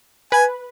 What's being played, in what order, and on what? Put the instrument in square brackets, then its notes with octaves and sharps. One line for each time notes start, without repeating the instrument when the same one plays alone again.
[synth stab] B4 [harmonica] G#5